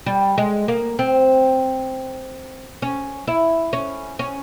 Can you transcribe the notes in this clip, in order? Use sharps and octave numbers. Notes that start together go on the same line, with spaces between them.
G3
G#3
A#3
C4
C#4
E4
C#4
C#4